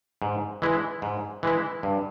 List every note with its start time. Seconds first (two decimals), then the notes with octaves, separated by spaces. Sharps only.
0.22 G#2
0.62 E3 G#3 E4
1.02 G#2
1.43 E3 G#3 E4
1.83 G2